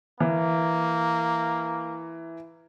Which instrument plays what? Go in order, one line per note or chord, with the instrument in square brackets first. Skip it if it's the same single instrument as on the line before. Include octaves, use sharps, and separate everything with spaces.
[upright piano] E3 [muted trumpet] A#3